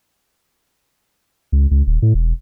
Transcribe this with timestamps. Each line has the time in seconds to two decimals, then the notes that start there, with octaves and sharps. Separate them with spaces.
1.52 C#2
1.71 C#2
1.87 D#1
2.02 A2
2.14 E1